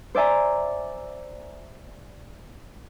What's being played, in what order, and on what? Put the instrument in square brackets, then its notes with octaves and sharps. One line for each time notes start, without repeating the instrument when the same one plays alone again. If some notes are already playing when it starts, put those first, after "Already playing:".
[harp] C5 D5 E5 G#5 A#5